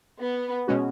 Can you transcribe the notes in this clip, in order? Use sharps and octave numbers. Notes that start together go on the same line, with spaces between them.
B3
B2 G#3 C#4 F#4